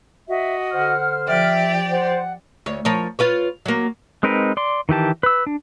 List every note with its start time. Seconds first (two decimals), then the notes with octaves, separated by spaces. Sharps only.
0.28 F#4 D#5 E5
0.72 D3 C5 F#5 F6
1.28 F3 G4 D5 E5 G5
1.91 C5 F#5
2.66 D2 C#5
2.85 F3 A#4 C#5
3.19 F4 B4 C#5
3.66 F#3 A#3
4.23 G#3 C4 D#4 A#4 B4
4.57 D5 C6
4.89 D#3 E3 G4 A5
5.23 B4 E6
5.47 D4